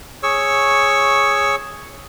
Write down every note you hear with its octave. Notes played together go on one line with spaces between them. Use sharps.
G#4 C#5 C#6 E6